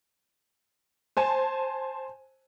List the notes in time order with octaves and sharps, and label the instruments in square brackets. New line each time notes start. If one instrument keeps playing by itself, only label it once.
[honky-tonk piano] C5 G#5 A5